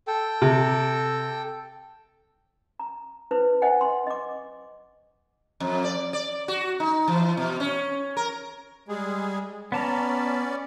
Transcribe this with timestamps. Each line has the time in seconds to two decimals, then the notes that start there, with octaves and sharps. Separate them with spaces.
0.07 A4 G5
0.42 C3
2.79 A#5
3.31 E4 B4 C5
3.62 C5 D#5 F#5 G#5
3.81 C6
4.07 D#5 D6
5.60 F2
5.84 D5
6.13 D5
6.48 F#4
6.80 D#4
7.08 E3
7.37 B2
7.60 C#4
8.17 A#4
8.88 G3 G#3 G#4
9.72 B3 C#4 D5 A5 A#5